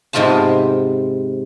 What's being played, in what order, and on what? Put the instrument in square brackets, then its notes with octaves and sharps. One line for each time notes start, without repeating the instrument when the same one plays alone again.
[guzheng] G#2 C3 G#3 B3 F4 A5